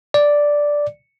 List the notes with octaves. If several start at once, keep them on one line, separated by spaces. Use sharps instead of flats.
D5